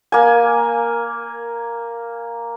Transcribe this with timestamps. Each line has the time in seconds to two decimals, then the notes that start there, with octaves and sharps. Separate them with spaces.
0.12 A#3 G#5